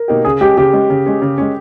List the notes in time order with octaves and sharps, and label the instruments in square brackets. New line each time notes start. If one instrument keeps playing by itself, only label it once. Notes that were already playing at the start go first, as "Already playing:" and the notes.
Already playing: [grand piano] A#4
[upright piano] B2 A#3 D#4 G4
[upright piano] C#3 [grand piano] G#4
[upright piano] G#3 C#4 [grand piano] G4
[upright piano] C#3 [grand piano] G4
[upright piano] G#3 C#4
C#3
G#3 C#4
C#3
G#3 C#4